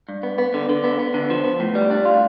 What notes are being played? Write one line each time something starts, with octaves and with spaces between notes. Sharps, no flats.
G2
B3
B3
D3
D3
B3
B3
D3
F3
B3
A2
G3
D4
F4